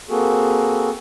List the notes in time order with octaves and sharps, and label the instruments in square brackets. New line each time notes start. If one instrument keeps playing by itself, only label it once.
[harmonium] A#3 C4 F#4 G#4 A4